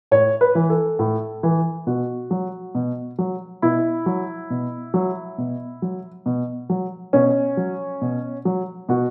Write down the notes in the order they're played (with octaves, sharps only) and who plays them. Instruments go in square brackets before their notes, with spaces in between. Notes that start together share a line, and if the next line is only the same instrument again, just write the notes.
[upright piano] A2 C#5
B4
E3
A4
A2
E3
B2 F#4
F#3
B2
F#3
B2 E4
F#3
B2
F#3
B2
F#3
B2
F#3
B2 C#4
F#3
B2
F#3
B2 F#4